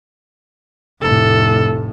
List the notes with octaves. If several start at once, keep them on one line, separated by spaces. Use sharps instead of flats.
F1 A2 A4